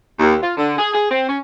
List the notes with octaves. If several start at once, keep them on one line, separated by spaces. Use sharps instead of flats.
D#2
F4
D3
G#4
G#4
C4
C#4